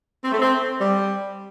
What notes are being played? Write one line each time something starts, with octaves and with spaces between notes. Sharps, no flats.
C4
A3
C4
G3